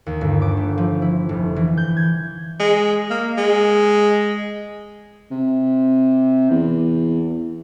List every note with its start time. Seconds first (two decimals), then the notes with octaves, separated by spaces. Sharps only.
0.06 D#2
0.21 G1
0.42 D6
0.57 A3
0.78 F3
1.02 E4
1.29 F1
1.56 E3
1.77 G6
1.96 G#6
2.60 G#3
3.10 A#3
3.38 G#3
5.31 C3
6.51 E2